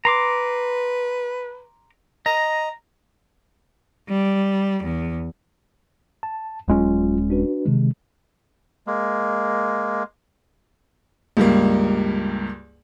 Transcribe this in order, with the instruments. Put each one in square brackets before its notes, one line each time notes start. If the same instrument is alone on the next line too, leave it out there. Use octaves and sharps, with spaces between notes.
[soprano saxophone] B4 [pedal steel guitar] A#5 C6 D6
[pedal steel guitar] D#5 [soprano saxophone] A#5
[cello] G3
E2
[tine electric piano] A5
[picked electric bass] D#1 G#3 C#4 [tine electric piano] F#3 F4
[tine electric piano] D4 F#4 B4
C3 D#3 G#3
[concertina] G#3 A#3
[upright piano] C#2 G2 G3 A#3